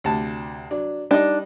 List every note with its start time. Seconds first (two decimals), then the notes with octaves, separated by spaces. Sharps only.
0.04 D2 C3 A5
0.71 F#3 D4
1.11 G3 D4 D#4 D#5